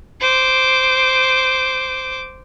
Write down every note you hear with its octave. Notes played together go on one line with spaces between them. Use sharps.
C5 D6